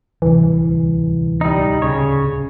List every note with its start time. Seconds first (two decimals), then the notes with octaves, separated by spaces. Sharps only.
0.22 D1 C2 E3
1.41 G3 D#4
1.82 C#3 C#5